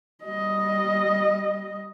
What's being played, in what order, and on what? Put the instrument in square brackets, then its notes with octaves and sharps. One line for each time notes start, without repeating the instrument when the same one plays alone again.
[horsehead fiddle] G3 D#5